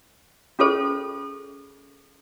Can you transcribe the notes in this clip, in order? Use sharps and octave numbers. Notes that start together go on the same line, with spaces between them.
C#4 F4 G#4 A4 C5